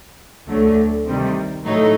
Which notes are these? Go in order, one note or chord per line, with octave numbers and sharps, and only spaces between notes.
D2 D3 F#3 A3
C3 D#3 G3
A2 F#3 A3 D#4